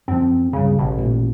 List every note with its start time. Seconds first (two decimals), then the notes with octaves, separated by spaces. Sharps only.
0.08 F#2 F3 C4
0.53 C#2 G2 C#3
0.79 A1 B2
0.98 A#2 A3